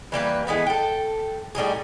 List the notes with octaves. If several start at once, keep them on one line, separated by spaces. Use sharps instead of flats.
E3 G3 A#3 B4
E3 G#3 B3 A4
A4 G5
A2 G3 D#4 G#4